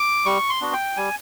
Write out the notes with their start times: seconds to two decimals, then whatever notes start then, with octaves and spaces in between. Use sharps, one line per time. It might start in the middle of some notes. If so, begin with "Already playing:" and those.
Already playing: D6
0.26 G3 C#6
0.50 C6
0.61 B3 D4 F#4
0.73 G5
0.97 G3 G#5